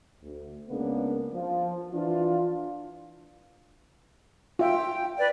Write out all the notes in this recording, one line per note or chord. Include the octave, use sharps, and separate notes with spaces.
D2
C#2 C#3 A#3 B3 D4
F3
E3 D4 F4
F4 E5 G5
B4 D5